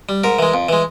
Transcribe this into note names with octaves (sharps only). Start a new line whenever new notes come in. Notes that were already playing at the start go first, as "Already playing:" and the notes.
G3
G#2 A#4
E3 G#3
F2
E3 G#3